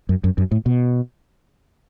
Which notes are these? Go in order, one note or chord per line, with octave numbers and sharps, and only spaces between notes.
F#2
F#2
F#2
A2
B2